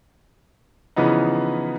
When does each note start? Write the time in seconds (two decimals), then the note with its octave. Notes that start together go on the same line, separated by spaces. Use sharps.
0.96 C#3 E3 F3 B3 D#4